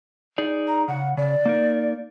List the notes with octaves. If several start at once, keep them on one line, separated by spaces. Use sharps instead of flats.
D#4 G#4 D5
A#5
C#3 F#5
C#3 D5
A#3 D#4 A#4